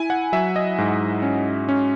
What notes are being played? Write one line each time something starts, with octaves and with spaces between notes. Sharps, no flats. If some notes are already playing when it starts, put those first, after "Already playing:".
Already playing: E4 G#5
F#5
F#3 E5
D#5
G#2
C#4
C#4